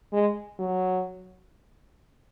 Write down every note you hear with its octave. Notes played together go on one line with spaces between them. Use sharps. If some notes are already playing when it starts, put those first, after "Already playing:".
G#3
F#3